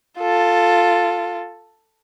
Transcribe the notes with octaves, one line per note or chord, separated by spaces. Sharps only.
F4 A4